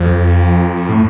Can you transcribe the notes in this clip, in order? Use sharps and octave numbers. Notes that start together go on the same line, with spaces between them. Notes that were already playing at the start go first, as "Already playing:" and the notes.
Already playing: F2
A2